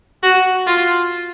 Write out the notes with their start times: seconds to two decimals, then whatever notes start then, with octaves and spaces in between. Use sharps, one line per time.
0.23 F#4
0.67 F4